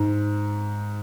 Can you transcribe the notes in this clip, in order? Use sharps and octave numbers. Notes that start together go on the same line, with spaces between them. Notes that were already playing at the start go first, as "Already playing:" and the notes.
Already playing: G#2